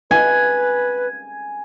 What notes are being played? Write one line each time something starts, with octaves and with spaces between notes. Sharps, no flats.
B4 G#5